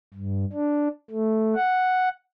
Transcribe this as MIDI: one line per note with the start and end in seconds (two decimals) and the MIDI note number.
0.14 0.45 43
0.53 0.88 62
1.10 1.55 57
1.56 2.09 78